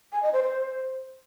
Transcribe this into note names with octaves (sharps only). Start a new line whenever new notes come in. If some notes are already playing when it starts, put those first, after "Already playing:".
G#5
D#5
C5
C5